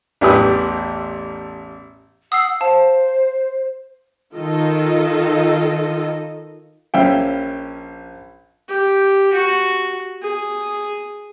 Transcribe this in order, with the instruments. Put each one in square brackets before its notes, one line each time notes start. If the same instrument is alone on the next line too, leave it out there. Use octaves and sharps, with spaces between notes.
[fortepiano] A1 E2 G4 B4 G#5 D#6
[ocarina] F#5 [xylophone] D#6 E6 C7
[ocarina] C5 [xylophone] F5 A5
[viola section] D#3 F4 A4 D#5
[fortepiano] A#1 C#4 E5 F5 G5
[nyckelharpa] G4
F#4
G#4